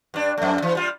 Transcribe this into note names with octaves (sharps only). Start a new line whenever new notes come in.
G2 D4
F2 A3
E3
G3 F4